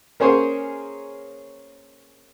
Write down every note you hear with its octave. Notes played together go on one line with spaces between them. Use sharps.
A#3 C#4 G#4 C5 C#5